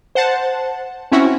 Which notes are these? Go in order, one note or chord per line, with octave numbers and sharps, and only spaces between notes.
C5 F#5 A5
C4 C#4 E4 F#4